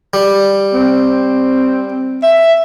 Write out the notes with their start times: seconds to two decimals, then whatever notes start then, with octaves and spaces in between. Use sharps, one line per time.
0.13 G3
0.74 C4
2.23 E5